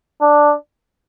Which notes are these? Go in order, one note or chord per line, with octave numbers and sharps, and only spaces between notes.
D4